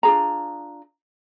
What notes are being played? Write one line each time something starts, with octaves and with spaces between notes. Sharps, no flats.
D4 F4 G#4 A#5